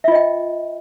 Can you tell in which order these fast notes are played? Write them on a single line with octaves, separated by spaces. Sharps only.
E5 F4 D#5 G5